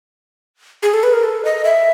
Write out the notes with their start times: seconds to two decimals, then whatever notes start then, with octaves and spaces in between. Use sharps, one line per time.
0.83 G#4
0.93 A4
1.03 B4
1.13 A#4
1.23 A4
1.45 D#5
1.65 E5